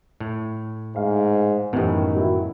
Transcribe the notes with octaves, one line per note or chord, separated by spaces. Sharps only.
A2
G#2 F5
F#2 A2 D#3 E3 B3 G4
F#3 E4 F#4